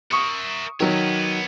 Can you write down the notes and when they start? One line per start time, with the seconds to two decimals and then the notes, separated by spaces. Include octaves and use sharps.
0.11 A#4 E5 C#6 D#6 C#7
0.80 D#3 F#3 B3 C#5